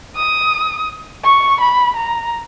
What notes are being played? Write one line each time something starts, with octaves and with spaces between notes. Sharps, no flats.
D#6
C#6
B5
A#5